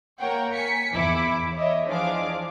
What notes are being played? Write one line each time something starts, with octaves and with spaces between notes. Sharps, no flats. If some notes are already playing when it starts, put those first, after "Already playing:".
A#3 A#4 C#5 F#5 G5
G#5 B6 C#7
E2 E4 D6
C#5 D#5 E5
E3 F3 D4 G#4 F5 D6